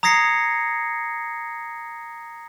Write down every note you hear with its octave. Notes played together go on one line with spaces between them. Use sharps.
A#5 D#6 G#6 A#6 C7 C#7